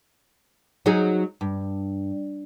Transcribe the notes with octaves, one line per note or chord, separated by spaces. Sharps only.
F#3 D#4 G#4
G2